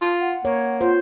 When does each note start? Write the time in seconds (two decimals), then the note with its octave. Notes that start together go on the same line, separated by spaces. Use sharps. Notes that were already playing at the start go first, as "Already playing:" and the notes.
0.02 F4
0.21 F#5
0.45 A#3 C#5
0.81 F4 C5